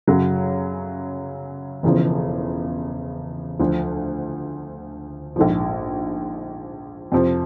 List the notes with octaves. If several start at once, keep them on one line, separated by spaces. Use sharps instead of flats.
F#2 C#3 F#3
E1 E2 C#3 F3
D2 D3 F3
A#1 G#2 F3
F2 C3 F3